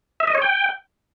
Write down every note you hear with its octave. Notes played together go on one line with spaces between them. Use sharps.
E5
D#5
C#5
G5